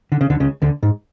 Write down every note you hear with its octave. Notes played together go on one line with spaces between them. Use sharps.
D3
C#3
D2 D3
C#2 C#3
D2 D3
G#2